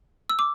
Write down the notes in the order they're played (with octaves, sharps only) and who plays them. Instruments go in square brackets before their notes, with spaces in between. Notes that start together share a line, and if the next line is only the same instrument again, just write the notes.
[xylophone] E6
D6